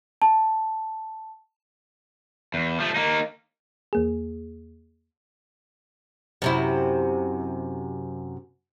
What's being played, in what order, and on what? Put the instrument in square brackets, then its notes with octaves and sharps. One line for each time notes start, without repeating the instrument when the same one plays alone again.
[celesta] A5
[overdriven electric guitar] E2
F3 A3
A#3 D#4
[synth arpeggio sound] E2 A#3 G#4
[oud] F#2 C3 E4